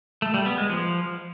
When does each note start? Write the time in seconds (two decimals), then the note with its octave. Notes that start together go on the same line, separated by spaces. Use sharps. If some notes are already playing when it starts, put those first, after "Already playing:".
0.22 A3
0.34 G3
0.46 B3
0.58 G#3
0.70 F3